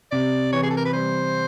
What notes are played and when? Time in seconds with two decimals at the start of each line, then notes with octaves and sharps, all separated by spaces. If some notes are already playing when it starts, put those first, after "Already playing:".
0.12 C3 D5
0.52 E3 C#5
0.63 G#4
0.71 A4
0.77 A#4
0.86 B4
0.93 G3 C5